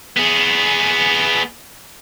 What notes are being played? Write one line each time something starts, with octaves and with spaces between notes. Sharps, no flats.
B3 G#4